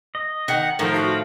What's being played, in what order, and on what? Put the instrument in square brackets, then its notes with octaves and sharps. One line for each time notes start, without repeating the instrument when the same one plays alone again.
[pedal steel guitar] D#5
[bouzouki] D#3 [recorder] F#5
[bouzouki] A2 [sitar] D#3 F3 [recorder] A#4
[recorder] F#4 [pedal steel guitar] F5